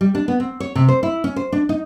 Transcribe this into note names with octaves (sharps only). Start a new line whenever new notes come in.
G3
D4
B3
C4
C#5
C3
C5
E4
C#4
C5
D4
D#4